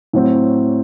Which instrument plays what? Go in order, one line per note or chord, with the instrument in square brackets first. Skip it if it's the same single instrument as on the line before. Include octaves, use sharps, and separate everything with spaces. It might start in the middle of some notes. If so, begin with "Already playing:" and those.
[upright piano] A2 F#3 C4